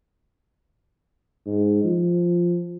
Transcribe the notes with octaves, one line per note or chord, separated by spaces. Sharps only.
G#2
F3